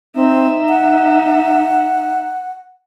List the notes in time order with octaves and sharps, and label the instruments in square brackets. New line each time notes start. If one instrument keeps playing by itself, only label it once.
[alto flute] C4 [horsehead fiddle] D#4 E5
[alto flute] F#5